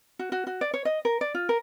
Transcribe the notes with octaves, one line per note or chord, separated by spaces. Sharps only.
F#4
F#4
F#4
D5
C#5
D#5
A#4
D5
F4
A#4